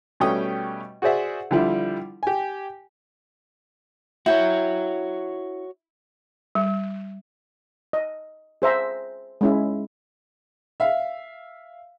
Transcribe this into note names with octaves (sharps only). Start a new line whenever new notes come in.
B2 G3 A3 C#4 G5 D#6
F#4 G#4 C5 D5 E5 F#5
D3 F3 G3 E4 F4
G4 G#5
E4 F#4 C#5 G5
G3
D#5
G#4 C5 E5 A#5
G#3 C#4 E4
E5 F5